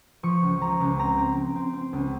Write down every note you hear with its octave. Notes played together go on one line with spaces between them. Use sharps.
F3 C#6
C#2
F3 A#5
C#2
C4 A#5
C4
C4
C4
C4
C#2